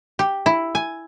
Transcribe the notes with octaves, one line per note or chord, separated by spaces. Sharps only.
G4
E4
G#5